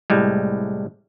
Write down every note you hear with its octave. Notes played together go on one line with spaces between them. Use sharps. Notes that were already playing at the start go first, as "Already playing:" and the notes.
C2 A2 G3 G#3